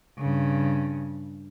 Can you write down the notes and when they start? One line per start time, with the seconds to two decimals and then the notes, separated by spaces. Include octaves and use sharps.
0.18 G2 C#3